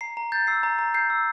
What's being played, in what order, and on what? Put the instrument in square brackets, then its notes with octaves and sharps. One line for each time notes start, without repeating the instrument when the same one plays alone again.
[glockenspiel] A#5 C7
A#5
G6 A6
E6 C7
A#5
A#5
G6 C7
E6